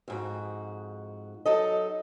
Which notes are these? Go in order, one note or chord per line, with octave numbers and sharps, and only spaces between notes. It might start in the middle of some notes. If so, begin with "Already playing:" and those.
F2 G#2 F#4
F#3 D#4 A4 D#5